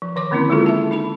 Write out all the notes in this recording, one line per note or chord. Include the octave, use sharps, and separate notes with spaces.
F3
D#3 C#5 D6
D3 A#3 C4 C#4 E4
G#3 D4 E4 F4 G#4 A4
E5 A5
D#4 A5 B5